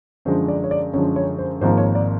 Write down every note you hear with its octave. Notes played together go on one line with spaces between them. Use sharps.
F#2 D3 F3 G#3 C5
D5
C#5
D5
F#2 D3 F3 G#3 C#5
C#5
C5
G#1 G#2 F3 A#3 C5
C#5
D5